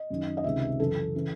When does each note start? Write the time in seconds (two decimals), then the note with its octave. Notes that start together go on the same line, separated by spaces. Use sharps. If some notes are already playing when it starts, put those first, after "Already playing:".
Already playing: D#5
0.10 F#2 D#3
0.37 D#5
0.44 C#2 C3 D#3 E5
0.80 F#2 C#3 E3 A4
1.15 C#3 E3